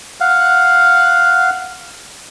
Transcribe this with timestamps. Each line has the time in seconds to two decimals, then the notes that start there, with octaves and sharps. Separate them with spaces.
0.20 F5 F#5